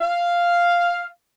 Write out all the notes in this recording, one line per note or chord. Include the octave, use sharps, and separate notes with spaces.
F5